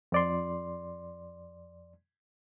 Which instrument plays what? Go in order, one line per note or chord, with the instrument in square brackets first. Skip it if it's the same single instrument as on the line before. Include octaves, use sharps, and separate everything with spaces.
[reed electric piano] F2 D5 C6